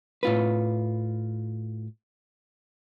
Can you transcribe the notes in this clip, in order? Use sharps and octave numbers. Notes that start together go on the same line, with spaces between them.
A2 F4 B4